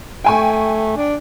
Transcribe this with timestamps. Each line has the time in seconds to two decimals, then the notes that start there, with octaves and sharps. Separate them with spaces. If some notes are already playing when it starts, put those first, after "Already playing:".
0.24 A3 G5 G#5 C#6
0.96 D4